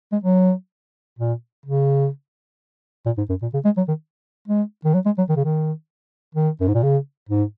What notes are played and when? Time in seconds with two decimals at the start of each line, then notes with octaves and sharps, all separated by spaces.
0.12 G#3
0.24 F#3
1.19 A#2
1.66 C#3
3.06 A#2
3.18 G#2
3.29 F#2
3.42 A#2
3.54 C#3
3.65 G#3
3.77 F#3
3.88 D#3
4.48 G#3
4.85 D#3
4.94 F#3
5.06 G#3
5.18 F#3
5.29 D#3
5.36 C#3
5.45 D#3
6.35 D#3
6.61 F#2
6.68 G#2
6.75 A#2
6.83 C#3
7.29 G#2